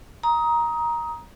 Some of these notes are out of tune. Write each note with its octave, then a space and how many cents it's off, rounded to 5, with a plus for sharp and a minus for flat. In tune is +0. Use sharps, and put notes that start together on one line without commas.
A#5 +15 D#6 +15